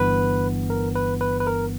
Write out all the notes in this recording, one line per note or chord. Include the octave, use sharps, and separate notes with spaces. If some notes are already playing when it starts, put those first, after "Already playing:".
Already playing: G1 G2 E3 B3 B4
A#4
B4
B4
B4
A#4